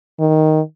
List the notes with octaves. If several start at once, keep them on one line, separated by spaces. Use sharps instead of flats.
D#3